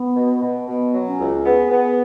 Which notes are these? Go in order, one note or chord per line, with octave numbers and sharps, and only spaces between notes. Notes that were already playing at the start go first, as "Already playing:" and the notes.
Already playing: B3
B2
B2
B2 B3
F#3
C#4
C#2
B3 G#4
B3